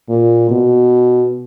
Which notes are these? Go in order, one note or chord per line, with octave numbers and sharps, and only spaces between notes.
A#2
B2